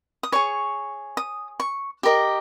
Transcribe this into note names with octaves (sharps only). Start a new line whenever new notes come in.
D#6
G#4 C#5 C#6
D#6
C#6
G4 A#4 D#5